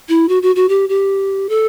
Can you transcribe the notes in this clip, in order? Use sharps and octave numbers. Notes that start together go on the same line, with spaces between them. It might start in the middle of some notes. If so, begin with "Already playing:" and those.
E4
F#4
F#4
F#4
G4
G4
A4